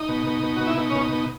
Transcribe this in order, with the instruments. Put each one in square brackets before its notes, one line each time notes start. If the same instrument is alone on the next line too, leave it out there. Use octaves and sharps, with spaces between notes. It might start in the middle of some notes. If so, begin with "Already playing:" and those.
Already playing: [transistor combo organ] D#4
B2
B2
B2
B2 F#4
E4
B2 D#4
C#4
B2
D#4
B2